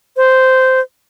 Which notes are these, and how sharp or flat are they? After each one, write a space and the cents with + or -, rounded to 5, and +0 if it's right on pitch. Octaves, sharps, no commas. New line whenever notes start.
C5 -10